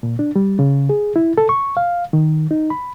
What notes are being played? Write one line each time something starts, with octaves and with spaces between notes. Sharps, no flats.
A#2
D4
G3
C#3
G#4
E4
A4
C#6
F5
D#3
D#4
B5